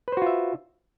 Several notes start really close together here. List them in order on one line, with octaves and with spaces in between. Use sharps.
B4 C5 F#4 F4 E5